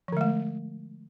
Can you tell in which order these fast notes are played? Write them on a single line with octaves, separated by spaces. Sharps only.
F3 D3 G#3 A3